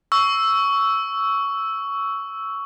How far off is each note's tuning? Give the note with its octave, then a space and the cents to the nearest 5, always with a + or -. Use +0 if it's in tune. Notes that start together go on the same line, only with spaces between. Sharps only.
C#6 +15 E6 +0